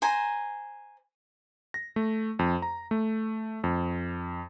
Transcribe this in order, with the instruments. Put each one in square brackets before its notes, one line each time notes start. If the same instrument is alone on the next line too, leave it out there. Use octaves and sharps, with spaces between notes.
[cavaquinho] C5 G#5 A#5
[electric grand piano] A#6
A3
F2
A#5
A3
F2